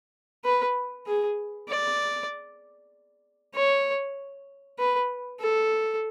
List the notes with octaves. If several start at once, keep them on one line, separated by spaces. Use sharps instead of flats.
B4
G#4
D5
C#5
B4
A4